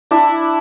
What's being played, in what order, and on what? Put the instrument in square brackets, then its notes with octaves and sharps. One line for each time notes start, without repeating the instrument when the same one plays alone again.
[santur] D4 [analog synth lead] E4